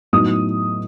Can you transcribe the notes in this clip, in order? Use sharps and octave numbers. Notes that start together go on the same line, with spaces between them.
A2 F#3 B3 D#4 D#6